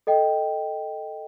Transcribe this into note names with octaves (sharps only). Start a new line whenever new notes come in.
A4 D#5 G5